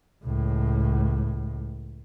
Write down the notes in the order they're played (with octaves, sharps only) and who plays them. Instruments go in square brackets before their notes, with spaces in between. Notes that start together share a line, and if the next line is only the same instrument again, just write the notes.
[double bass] C#2 A2